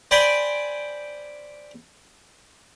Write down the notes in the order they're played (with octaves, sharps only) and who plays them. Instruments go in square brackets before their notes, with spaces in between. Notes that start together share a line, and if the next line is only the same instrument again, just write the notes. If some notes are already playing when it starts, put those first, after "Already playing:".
[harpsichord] C5 D5 G5 G#5 B5